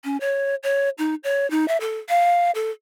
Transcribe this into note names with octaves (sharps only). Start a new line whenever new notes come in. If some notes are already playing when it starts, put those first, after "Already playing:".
C#4
C#5
C#5
D#4
C#5
D#4
E5
A4
F5
A4